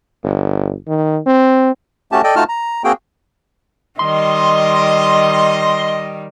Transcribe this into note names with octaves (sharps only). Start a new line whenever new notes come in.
G1
D#3
C4
A3 C#4 F#4 G4 A5
A4 D5 D#5 G5
A3 D#4 F4 F#4 A5 F6
A#5
A#3 C4 F#4 G#4 G5
D#3 G3 D#5 C6